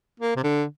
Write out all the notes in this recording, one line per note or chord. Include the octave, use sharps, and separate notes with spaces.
A#3
C3
D3